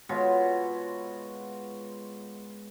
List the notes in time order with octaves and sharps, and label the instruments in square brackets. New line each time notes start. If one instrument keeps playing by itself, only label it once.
[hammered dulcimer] B2 G#3 F4 C#5